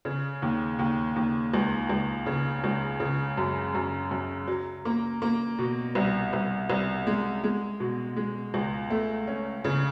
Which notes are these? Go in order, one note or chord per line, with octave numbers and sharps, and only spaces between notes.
C#3
D#2
D#2
D#2
C#2
C#2
C#3
C#2
C#3
F#2
F#2
F#2
F#3
A#3
A#3
B2
C2
C2
C2
G#3
G#3
B2
G#3
C#2
A3
C#4
C#3